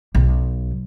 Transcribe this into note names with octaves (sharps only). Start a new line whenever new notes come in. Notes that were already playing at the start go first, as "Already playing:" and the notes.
B1